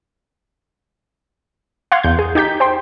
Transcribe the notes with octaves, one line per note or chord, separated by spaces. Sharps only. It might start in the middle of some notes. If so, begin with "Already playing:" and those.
F5 F#5 C6 F6 G#6
E2 G6
G#4
D#4 G4 G6 B6
C5 G5 C6